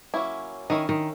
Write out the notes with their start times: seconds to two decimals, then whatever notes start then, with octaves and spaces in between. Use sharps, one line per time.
0.14 F#3 A#3 C#4 E4
0.70 D#3 C#4 E4 A#4 D#5
0.89 D#3